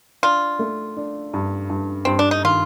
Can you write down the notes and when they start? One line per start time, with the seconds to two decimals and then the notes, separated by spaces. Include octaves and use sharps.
0.23 D4 F4
0.59 A3
0.97 D4
1.34 G2
1.70 G2
2.05 G2 C4
2.19 D4
2.31 D#4
2.44 D#3 F4